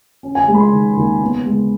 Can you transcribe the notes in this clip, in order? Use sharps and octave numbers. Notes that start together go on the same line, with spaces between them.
C#4
G#5
G#3
B5
C6
D#3
D#2
B3
G#3